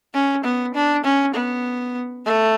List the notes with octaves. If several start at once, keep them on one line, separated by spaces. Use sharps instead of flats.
C#4
B3
D4
C#4
B3
A3